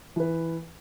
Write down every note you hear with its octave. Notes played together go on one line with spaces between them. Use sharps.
E3 B4